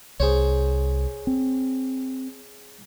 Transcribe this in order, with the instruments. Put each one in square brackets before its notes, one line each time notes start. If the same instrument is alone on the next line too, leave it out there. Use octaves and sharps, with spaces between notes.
[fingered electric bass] C2 [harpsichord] G#4 C5 C#5
[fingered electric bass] C4